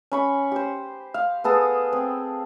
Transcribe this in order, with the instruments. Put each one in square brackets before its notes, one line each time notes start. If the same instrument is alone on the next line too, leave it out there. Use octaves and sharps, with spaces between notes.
[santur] C#4 B5 C#6
G4 C5
F5
B3 G#4 A4 D#6
C4